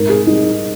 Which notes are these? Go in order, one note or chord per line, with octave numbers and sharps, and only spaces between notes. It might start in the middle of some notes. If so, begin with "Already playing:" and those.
Already playing: G#2 A#4
G#4
G3 D#4